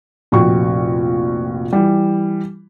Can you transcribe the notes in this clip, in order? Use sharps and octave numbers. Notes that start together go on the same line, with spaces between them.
F1 A#1 F#4 G5 C#6
E3 G3